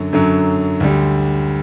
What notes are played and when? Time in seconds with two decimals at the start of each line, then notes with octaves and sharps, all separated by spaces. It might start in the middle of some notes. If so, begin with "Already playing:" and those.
Already playing: F#2 D3 F#3
0.13 F#2 D3 F#3
0.80 D2 D3 G3